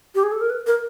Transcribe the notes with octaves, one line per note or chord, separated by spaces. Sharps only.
G4
G#4
A4
A#4
B4
A#4